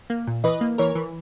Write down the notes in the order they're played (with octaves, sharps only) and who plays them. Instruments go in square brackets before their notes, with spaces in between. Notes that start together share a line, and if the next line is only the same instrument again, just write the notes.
[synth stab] A#3
A#2
E3 B4 D#5
A#3
E3 A#4 C#5
E3